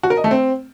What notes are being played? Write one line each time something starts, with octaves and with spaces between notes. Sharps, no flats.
F#4
A#4
D#5
A3
C4